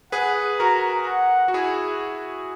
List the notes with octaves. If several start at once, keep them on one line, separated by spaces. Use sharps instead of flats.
G#4 B4 F#5
F#4 A#4 A#5
F#5
F#4
E4 G#4